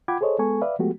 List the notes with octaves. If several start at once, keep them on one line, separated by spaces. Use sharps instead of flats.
F4 F#5 G5 B5 D6 G#6
G#4 A4 C5 C#5 D#5
G#3 B3 A4 G#5 C#6
B4 D5 E5 F5
F3 G#3 A3 B3 F#4 G4